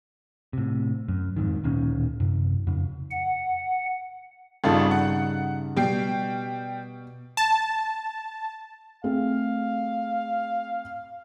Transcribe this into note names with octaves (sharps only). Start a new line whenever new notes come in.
A2 C3
F#2
F2 G#2 D#3
D1 A#2 D#3 C#4
F#2 C3
F2 C#3
F#5
G#1 G2 C#3 D#4 F4 A4
F#5
B2 G3 G5 C7
A5
A3 C4 G#4 F5